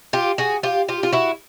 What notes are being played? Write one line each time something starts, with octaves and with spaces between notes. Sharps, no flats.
F4 G4
F#4 G#4
F4 G4
F4 G4
F4
E4 F#4